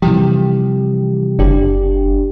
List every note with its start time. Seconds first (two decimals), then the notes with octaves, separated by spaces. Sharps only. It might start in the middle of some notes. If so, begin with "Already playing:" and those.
0.02 C3 E3 F3 G3 G4
1.39 F#1 D4 G4